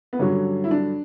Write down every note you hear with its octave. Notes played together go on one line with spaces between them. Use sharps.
B3
G2 D3 F#3 C#4
E4
D4